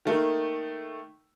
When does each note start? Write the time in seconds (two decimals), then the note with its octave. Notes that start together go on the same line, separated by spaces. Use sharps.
0.05 D#3 A3 A#3 D#4